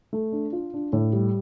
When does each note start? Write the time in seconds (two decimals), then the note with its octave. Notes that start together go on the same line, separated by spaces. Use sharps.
0.13 A3
0.32 D4
0.53 F4
0.74 D4
0.93 A2
1.13 G3